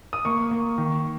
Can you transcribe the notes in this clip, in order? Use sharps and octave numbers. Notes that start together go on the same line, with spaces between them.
D#6
A#3 C#6
A#3
D#3